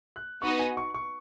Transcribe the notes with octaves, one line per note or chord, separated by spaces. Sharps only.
F#6
B3 D#4 F#4 B4 D#5 C#6
G#5
C#6
C#6